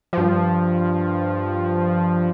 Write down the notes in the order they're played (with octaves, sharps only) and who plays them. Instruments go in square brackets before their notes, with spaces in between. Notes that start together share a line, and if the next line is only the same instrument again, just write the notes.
[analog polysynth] G2 F3